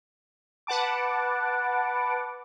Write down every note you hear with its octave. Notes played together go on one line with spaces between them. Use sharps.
B4 F#5 A5 D6